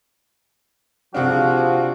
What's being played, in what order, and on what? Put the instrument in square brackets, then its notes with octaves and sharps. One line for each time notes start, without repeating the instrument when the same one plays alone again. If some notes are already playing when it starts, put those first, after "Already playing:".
[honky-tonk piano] C3 C4 D4 [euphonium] F3 [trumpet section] F#4 G#4 F5